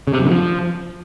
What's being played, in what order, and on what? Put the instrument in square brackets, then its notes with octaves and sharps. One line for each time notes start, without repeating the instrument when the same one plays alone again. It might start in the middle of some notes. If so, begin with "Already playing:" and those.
[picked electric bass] C#3
C3
F#2
D3
F3